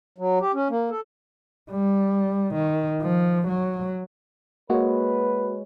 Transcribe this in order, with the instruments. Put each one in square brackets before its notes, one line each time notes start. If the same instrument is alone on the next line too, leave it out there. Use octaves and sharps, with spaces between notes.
[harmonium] F#3
G4
C#4
A#3
A4
[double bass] G3
D#3
F3
F#3
[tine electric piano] G#3 C#5 [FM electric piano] A#3 F#4 [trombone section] B4